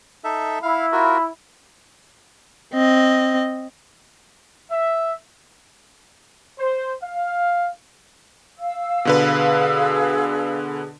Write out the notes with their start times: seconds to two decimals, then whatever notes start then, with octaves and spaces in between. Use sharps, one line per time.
0.24 D#4 A4 E5
0.63 E4 F5
0.92 F4 F#4 A#4
2.74 C4 D#5
4.71 E5
6.59 C5
7.03 F5
8.59 F5 E6
9.05 B2 D3 G#4 B4